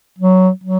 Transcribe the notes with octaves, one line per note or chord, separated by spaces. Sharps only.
F#3
F#3